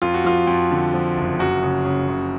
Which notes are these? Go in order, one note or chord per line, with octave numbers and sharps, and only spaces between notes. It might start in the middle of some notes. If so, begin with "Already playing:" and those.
F2 F4
F#4
F3 F4
F2
D3
F3
F#1
F#2 F#4
C#3
C#3
C#3